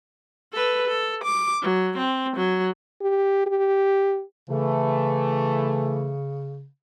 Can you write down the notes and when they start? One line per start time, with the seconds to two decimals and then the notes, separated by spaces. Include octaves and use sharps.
0.53 A4 B4
0.87 A4
1.24 D6
1.62 F#3
1.97 C4
2.36 F#3
3.01 G4
3.47 G4
4.50 C#3 E3 A3